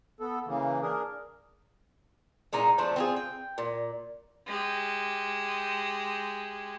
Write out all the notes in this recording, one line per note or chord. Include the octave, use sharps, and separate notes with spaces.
B3 A4
C#3 E3 A#3
D4 G#4 A#4
A#2 G#3 A#3 D#4
F3 A3 C4 D4
C4 F4 G#4
G5
A#2
G#3 G4